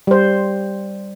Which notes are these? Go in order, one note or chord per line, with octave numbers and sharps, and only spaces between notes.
G3 C5